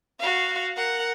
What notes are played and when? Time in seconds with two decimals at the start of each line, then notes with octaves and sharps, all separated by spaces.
0.19 F#4 F5
0.77 A#4 F#5